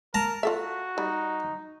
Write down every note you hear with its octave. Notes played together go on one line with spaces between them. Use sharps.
A#4 A5 A#5
F4 F#4 A4 E5
G3 D#4